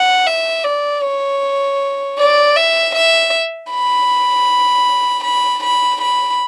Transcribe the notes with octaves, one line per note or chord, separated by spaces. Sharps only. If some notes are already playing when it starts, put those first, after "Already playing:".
Already playing: F#5
E5
D5
C#5
D5
E5
E5
B5
B5
B5
B5